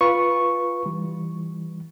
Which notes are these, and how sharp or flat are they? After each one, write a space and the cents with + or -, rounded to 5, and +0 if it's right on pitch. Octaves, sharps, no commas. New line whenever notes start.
F4 +0 B4 -10 C#6 +0
E3 +0 G3 +0